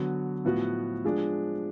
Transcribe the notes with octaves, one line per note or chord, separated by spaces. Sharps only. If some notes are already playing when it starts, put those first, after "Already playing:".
Already playing: D3 F#3 B3 F#4
A2 F3 B3 F#4
F3 G#3 D4